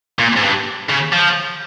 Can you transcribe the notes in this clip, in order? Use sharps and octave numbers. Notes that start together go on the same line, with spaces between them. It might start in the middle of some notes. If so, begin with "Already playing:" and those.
A#2
G#2
G2
C#3
F3